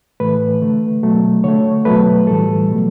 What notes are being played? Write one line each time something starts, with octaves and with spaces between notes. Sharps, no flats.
A2 E3 A3 B4
D3 A3
B2 F#3 A3
D3 A3 C#5
B2 F#3 A3 B4
A2 E3 G3 A4
B2 F#3 A3